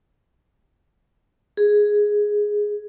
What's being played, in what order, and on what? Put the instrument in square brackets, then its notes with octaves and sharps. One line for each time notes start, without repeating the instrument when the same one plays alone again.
[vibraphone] G#4